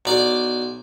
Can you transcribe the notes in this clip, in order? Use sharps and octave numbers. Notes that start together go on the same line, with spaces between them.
B1 D5 D6